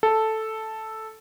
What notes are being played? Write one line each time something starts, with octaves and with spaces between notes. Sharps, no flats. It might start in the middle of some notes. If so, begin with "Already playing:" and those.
A4